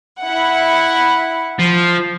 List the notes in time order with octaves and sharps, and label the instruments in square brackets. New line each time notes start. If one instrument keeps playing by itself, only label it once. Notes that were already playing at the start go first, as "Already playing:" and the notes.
[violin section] E4 F#5
[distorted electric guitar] F3